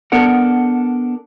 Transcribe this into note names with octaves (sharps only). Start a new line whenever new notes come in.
B3 D4 A4 A#4 F#5